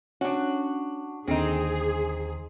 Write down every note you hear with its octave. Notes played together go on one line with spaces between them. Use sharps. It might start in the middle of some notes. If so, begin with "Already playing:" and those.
C#4 D4 F#4
D#2 D3 C4 D#4 G#4